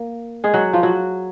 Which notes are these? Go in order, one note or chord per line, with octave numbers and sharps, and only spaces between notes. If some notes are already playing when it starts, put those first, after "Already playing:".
Already playing: A#3
G#3 G#4
F#3 F#4
F3 F4
F#3 F#4